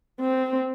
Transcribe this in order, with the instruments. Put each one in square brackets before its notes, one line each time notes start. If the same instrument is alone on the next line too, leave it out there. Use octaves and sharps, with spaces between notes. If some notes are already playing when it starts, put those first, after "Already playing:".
[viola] C4